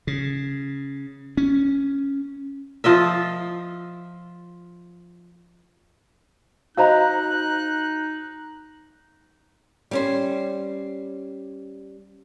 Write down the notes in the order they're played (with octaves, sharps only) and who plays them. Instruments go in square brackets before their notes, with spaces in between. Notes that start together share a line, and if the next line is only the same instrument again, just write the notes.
[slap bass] C#3
C#4
[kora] F3 F4 D#5 E5
[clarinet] D#4 [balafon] F#4 C5 D#5 [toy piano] F5 A#5 B5 [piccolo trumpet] F#6
[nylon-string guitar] G3 C#4 C5